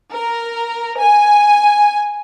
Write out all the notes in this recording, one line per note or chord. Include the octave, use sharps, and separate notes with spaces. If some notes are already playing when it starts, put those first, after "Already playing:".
A#4
G#5